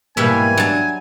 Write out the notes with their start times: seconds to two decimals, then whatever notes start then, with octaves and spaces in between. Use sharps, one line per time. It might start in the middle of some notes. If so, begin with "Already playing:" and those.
0.17 G#2 B2 E3 G3 A#3 B4 E5 G#5
0.58 F#3 D4 A5